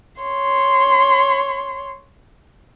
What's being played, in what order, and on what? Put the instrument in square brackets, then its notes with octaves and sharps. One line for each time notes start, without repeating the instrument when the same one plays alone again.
[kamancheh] C#5 C6